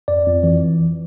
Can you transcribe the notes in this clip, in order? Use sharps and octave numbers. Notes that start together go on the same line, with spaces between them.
F2 D5
F2
E3